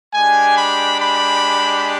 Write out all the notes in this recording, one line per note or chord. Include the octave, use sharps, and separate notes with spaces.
G#3 D4 G4 G#5
B5
B5